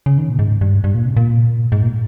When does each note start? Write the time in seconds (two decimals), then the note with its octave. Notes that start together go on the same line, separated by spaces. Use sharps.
0.06 C#3
0.18 D#3
0.29 A#2
0.39 G#2
0.61 G2
0.84 G2
0.95 A#2
1.06 C3
1.17 A#2
1.72 G#2
1.83 A#2